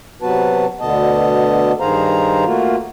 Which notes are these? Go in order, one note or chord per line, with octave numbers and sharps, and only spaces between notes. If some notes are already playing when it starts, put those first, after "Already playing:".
C3 F#3 B3 F#4 B4 A5
D2 B2 D3 B3 D#5 A5
G2 D#3 G#4 C5 F5 A#5
A3 A#3 F4 F#4